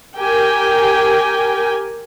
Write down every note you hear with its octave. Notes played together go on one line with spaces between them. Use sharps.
G4 A#4 G5 G#5